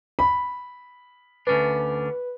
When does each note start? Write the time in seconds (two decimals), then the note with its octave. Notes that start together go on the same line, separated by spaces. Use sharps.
0.19 B5
1.47 D2 C#4 D4 B4